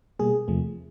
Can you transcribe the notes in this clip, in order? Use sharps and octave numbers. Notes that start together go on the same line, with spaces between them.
B2 G3 A#3 G#4
E2 C3 F3 A3